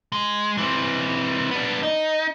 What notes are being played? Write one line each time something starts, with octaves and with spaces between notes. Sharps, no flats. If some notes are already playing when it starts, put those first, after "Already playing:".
G#3
E3 C4
B3 D4
D#4